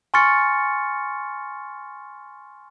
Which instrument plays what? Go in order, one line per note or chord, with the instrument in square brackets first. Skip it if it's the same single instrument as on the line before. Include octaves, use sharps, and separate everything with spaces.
[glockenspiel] G#5 C6 C#6 F6 A6 C#7